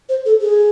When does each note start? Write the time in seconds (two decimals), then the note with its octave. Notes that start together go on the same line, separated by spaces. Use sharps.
0.09 C5
0.26 A4
0.41 G#4